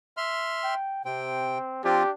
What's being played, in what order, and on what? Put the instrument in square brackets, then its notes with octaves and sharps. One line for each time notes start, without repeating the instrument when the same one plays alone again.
[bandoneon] E5 C6 F6
[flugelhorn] G5
[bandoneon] C3 G5 [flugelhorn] C4
[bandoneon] F3 C4 F4 [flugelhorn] D4 [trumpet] G4